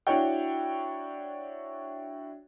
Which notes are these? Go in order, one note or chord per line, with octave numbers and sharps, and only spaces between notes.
D4 E4 F#4 C#5 G5